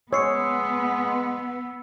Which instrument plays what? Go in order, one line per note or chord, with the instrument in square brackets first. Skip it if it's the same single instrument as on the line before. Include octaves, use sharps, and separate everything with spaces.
[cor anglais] G#3 [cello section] B3 [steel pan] C#5 [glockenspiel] E6 C7 C#7